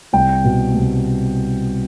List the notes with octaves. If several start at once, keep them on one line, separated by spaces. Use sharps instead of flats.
C2 G5
B2
C2